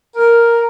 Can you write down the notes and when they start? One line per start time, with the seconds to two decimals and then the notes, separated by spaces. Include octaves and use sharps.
0.16 A#4